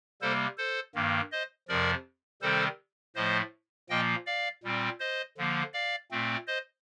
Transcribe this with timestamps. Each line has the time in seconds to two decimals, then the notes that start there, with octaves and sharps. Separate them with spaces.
0.22 C3 G3 A#3 A4 C5
0.58 A4 C5
0.95 G2 D#3 A#3
1.32 C5 D#5
1.68 F2 C3 F3 A#4 D5
2.42 C3 D#3 G3 C4 A4 C5
3.15 A2 F3 A3 C5 D#5
3.90 A#2 F3 A#3 D#5 G5
4.26 D5 F5
4.64 A#2 G3 C4
5.00 C5 D#5
5.37 D3 F3 A#3
5.73 D5 F5
6.11 A#2 A3 C4
6.47 C5 D#5